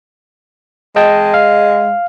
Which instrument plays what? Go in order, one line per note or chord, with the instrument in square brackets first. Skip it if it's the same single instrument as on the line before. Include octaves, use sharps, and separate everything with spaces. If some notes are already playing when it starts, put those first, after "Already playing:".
[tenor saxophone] G#3 [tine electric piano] D#5 G5 A5
[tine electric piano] F5